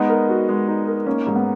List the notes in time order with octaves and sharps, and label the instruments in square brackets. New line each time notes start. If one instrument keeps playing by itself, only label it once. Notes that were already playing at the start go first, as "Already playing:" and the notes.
Already playing: [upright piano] G#3 D#4 [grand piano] B3
[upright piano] A#4
F#4
G#3
D#4
A#4
[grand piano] A#3 [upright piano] C#4
[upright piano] G#2
[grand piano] B3